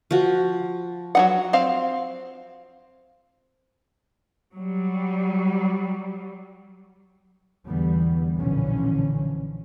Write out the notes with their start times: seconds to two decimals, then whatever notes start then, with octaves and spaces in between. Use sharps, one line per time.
0.11 F3 F#4
1.15 F#3 D#4 F#5
1.53 C4 F5
4.54 F#3 G3
7.66 E2 D3 E3 G3 B3
8.38 B1 A#2 D3 E3 F3 C#4